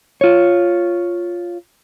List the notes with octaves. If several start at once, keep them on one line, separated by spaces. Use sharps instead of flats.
F4 C#5